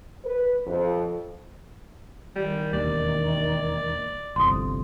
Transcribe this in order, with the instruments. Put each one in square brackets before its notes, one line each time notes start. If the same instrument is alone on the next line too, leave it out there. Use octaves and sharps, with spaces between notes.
[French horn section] B4
F2
[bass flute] D#3 [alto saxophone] G3
[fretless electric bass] E1 D#2 [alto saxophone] D5
[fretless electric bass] G1 C2 F2 [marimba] C6 D#6